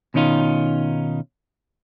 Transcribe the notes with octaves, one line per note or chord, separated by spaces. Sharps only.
B2 D#3 C#4 D#4 F4